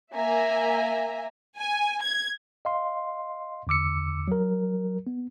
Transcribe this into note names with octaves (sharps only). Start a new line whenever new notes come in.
A#3 E5 G#5 A#5
G#5
G#6
D#5 F5 C6
E2 D3 D6 E6 C#7
F#3 A#4
B3